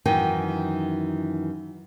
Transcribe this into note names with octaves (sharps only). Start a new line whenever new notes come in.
F#2 D#3 E3 D#4 G5